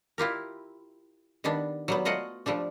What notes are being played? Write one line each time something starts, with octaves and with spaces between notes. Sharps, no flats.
E4 F4 G4 A#4
D#3 G3 B3 D4
F#3 G3 B3
A3 F4 F#4 D#5 F#5
F3 G3 A3 D4